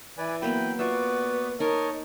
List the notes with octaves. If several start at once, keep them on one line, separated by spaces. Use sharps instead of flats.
E3 B4 D5 G#5
F#3 A#3 B3 G5 B5
B3 F4 F#4 D5 E5
D#4 A#4 C#5 D#5 A5